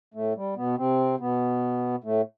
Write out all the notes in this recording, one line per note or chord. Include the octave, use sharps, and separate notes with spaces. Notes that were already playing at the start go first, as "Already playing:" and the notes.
A2 A3
G3
B2 B3
C3 C4
B2 B3
A2 A3